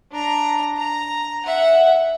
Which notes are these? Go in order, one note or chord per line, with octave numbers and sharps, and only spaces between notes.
D4 A#5
A#5
E5 F#5